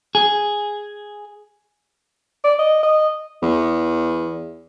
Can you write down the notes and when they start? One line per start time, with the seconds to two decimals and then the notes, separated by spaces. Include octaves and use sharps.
0.15 G#4
2.44 D5
2.59 D#5
2.83 D#5
3.42 E2